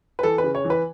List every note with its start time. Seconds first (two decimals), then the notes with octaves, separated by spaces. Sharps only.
0.19 B4
0.23 E3 A4
0.38 B4
0.44 C#3
0.55 C#5
0.65 E3
0.70 B4